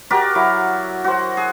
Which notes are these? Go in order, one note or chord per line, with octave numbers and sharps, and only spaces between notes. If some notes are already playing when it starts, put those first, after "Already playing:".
F#4 G4 A#4 D5
F#3 E4
F#4 C5
G#4